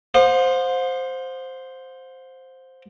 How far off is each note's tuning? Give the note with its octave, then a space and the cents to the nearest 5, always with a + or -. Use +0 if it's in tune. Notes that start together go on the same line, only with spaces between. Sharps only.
C5 +0 F5 +45 D#6 -40